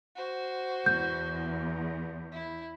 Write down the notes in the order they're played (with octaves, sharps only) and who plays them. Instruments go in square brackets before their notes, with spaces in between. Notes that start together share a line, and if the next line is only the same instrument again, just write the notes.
[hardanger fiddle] F#4 C5
[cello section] E2 [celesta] G6
[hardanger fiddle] E4